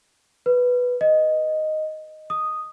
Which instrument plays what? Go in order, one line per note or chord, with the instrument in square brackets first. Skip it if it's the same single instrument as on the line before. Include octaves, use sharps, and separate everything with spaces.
[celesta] B4
D#5
D#6